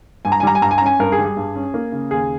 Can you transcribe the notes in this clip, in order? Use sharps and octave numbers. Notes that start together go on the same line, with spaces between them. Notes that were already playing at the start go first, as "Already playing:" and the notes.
G2 G#5
A#5
G#5
G3 A#5
G#5
G2 A#5
G#5
A#5
C#4
G#5
G2 A#4
G#4
G3
G#4
G2
C#4
A#3
C#3
D#2 G#4